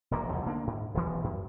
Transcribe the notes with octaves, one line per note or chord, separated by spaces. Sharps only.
E1 A#1 C3 A#3
C2 F2 F3
D3 A#3 B3 D4
G#2
D#1 B1 E3 G3
F#2